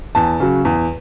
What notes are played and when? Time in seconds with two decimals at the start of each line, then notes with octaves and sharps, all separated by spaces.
0.15 E2 A5
0.40 C#3 F#3
0.65 E2